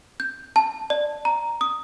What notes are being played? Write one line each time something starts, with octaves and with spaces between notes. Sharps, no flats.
G6
A5
D5
A#5
D#6